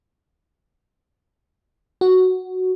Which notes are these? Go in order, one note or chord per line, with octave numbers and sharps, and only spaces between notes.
F#4